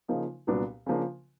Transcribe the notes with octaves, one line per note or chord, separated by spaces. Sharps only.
C#3 F3 A#3 D#4
C2 A#2 F#3 B3 D4
C#3 F3 A#3 D4